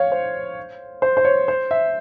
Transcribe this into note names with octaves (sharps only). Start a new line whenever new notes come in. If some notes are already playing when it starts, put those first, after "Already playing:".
Already playing: C#5 F5
C5
C5
C5
C#5
C5
E5